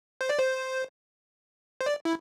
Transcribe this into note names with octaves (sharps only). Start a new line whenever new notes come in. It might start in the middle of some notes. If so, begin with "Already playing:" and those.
C5
D5
C5
C5
D5
E4